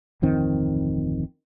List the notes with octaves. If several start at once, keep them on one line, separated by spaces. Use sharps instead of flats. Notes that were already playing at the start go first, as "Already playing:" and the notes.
D1 F2 D#3 C4